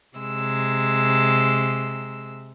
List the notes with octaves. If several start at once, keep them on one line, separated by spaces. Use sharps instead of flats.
C3 G#3 E6